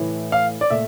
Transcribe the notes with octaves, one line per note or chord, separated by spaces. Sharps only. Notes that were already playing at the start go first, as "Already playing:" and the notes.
Already playing: A2 E3 A3
F5
D5
A#2 A3 E5